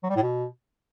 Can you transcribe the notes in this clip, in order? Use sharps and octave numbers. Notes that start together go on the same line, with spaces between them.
F#3
G3
A2
B2